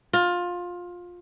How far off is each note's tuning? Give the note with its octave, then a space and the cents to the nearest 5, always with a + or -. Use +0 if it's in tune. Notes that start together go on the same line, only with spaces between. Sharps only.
F4 +20